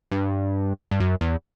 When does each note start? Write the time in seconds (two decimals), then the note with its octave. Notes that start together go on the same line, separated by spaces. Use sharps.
0.11 G2
0.91 G2
1.00 F#2
1.21 E2